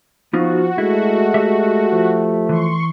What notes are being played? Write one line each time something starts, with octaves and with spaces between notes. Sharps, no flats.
F3 B3 D#4 F4 F#4
G#3 A3 E4
G4 E5
F3
E3 C6 C#6